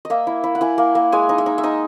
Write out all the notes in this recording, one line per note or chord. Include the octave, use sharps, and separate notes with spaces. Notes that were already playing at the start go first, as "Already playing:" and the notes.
D#5
A#3 E5
E4
E4
F#5
E4 G#5
A#3
A#3
G#3 G#5
D#4
E5
D#4
E5
D#4 D#5